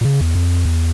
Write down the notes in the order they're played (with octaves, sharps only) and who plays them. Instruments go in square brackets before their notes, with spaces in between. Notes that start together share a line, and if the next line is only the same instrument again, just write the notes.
[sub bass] A#2
C#3
E2
F2
E2